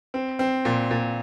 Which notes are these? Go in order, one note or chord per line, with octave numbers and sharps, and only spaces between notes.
C4
C4
A#2
A#2